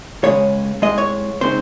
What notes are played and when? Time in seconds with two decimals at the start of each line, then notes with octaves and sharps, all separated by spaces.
0.23 C#2 C#3 G#3 C#4 C#5
0.82 C2 A#2 G#3 D#5
0.98 C#5
1.41 C#3 G#3 C4 D#4 C5